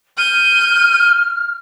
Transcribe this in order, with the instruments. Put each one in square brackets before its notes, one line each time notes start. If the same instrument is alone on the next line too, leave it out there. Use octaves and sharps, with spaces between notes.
[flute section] F6 [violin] G6 D#7